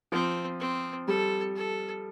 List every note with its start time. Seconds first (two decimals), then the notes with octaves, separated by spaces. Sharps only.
0.12 F3 C4
0.60 C4
1.07 G3 A4
1.56 A4